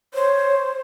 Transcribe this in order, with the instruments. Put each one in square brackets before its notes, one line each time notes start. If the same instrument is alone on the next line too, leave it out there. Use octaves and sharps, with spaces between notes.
[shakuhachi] C5 [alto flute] C#5